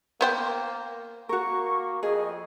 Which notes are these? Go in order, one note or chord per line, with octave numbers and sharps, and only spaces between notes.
A#3 B3 C5 G5
A#3 F#4 A#4 C#6
F2 G#4 D#5